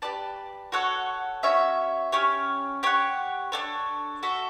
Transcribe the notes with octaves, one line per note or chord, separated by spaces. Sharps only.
G4 B4 D5 A5
F#4 A4 C#5 F#5
C#4 F#4 C#5 E5
C#4 G4 C#5
G4 C#5 F#5
D4 A4 C#5
F#4 A4 E5